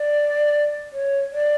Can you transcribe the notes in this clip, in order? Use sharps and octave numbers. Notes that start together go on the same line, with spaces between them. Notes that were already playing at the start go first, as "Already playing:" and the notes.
Already playing: D5
C#5
D5